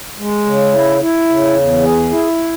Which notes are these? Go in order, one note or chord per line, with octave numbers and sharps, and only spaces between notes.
G#3
C#3
E4
E4
C#3
E2
G#4
E4